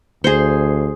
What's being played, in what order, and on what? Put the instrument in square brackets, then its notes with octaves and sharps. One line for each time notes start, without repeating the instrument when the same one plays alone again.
[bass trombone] D2 [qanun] G#4 C5